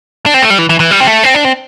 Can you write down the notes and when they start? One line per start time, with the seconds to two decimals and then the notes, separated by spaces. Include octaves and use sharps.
0.26 D4
0.34 C4
0.42 A3
0.50 G3
0.59 E3
0.69 E3
0.80 E3
0.91 G3
1.00 C4
1.07 A3
1.24 C4
1.34 D4
1.45 C4